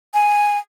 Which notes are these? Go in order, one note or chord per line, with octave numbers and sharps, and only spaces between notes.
G#5